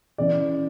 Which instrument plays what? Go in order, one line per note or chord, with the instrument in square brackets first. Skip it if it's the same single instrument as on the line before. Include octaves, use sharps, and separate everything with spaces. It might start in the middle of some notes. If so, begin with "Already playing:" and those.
[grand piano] C#3 E3 D5